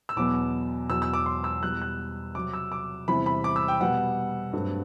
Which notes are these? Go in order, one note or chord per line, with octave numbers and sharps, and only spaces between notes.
E6
E2 B2 F#3 B3 D6
E2 B2 F#3 E6
E6
D6
C6
E6
E2 B2 G3 B3 F#6
F#6
C3 F#3 C4 D6
E6
D6
E2 C3 E3 G3 B5
B5
D6
E6
G5
B2 G3 B3 F#5
G2 F#3 A3 C4